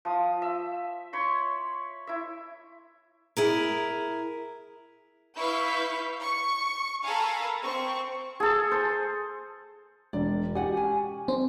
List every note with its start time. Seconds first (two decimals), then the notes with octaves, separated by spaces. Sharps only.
0.05 F3 D#6
0.42 E5
1.13 C#5 B5 C6
2.07 E4 E5
3.37 E4 G#4 A#4
5.38 E4 B4 F5 C#6 G6 B6
6.22 C#6 C#7
7.05 A4 A#4 F5 G#5 A#5 B5
7.63 C4 C#6
8.40 G#4 A4
8.71 C5
10.13 E1 D5
10.55 G4 D5 F#5 G#5
10.76 C#4 G#5
11.28 C4